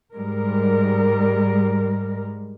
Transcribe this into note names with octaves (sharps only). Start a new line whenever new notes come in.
G#2 G3 G#3 A#4